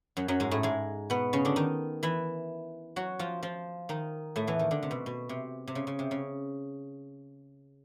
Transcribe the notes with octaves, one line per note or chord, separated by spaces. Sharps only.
F#2 F#3
F#2 F#3
G#2 G#3
A2 A3
G#2 G#3
B2 B3
C#3 C#4
D3 D4
D#3 D#4
E3 E4
F#3 F#4
F3 F4
F3 F4
D#3 D#4
A2 A3
E2 E3
D#3
D3
C3
B2
B2
C3
C3
C#3
C#3
C3
C#3